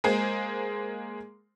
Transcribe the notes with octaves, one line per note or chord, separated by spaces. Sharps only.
G#3 A#3 G#4 C5